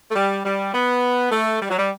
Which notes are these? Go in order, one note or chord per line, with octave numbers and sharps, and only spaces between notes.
A3
G3
G3
B3
A3
G3
F#3
G3